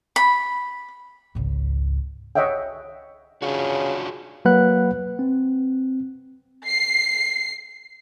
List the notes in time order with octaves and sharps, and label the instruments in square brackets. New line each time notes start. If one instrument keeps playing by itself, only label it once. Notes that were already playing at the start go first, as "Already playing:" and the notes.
[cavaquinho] B5
[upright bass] G#1 C#2
[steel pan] C#5 D#5 E5 F#5 G5
[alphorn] C#3 [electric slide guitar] D4 F4 F#4
[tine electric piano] F#3 A#3 B4 F#5 F#6
C4
[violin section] C7